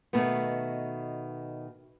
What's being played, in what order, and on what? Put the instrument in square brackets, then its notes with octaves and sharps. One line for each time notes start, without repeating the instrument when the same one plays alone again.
[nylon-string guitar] B2 D#3 A3 B3